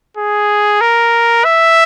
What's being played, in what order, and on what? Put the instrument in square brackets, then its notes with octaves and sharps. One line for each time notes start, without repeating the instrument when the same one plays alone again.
[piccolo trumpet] G#4
A#4
E5